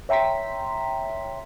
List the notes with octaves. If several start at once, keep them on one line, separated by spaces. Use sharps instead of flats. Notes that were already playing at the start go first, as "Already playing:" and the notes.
C#5 E5 G5 A#5 C6 B6